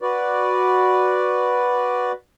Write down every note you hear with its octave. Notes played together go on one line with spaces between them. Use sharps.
F#4 B4 D5